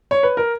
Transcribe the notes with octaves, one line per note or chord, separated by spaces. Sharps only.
C#5
B4
A#4